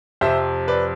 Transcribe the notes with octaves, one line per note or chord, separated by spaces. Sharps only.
F2 C3 F3 C5 E5
B4 D5